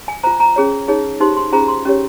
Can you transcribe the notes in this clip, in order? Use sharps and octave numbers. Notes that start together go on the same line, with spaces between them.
G#5
F4 C5 A#5
A#5
C#4 G#4 C#5
D#4 G#4 C#5
D#4 G4 C5 C6
C6
C#4 F4 G#4 C5 A#5
C6
C#4 G4 C#5